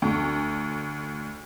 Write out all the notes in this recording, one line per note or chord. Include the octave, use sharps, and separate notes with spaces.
D2